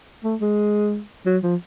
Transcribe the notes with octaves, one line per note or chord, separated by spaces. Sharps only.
A3
G#3
F#3
F3